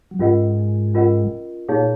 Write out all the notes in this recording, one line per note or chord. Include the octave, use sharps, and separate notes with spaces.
F#3
G#2 G#3 C#4 F4 A#4 D#5 F#5
C#4 F4 A#4 D#5 F#5
A#2 A#3 D#4 G#4 C#5 F5